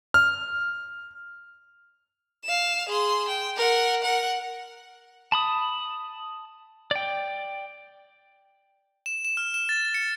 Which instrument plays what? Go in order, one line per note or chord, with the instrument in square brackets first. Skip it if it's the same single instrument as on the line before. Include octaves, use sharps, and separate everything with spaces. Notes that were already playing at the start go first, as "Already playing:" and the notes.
[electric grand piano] F6
[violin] F5 E7
G#4 C6
G5
A#4 F#5
A#4 F#5
[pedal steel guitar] A5 B5 D#6
D5 G5
[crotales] E7
E7
F6
E7
A6
C#7